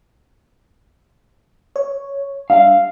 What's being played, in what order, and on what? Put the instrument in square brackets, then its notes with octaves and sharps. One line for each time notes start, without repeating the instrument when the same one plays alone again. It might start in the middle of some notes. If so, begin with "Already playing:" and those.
[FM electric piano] C#5
[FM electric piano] G3 D4 E5 [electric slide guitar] F5